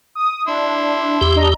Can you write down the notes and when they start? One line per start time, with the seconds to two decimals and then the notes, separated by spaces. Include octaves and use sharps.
0.15 D#6
0.48 D4 E4 C6
1.21 E2 G4
1.36 D4 D#5 A#5